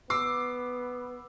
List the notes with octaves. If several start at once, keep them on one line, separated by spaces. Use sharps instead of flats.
B3 D6 E6 C7